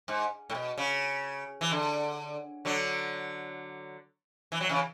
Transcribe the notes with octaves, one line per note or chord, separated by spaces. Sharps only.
G#2
A2
B2
C#3
E3
D3
D3 F#3
E3
F#3
C#3 E3